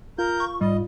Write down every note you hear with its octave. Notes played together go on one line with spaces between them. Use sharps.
F4 A#4 G6
C#6
G#2 G3 D#5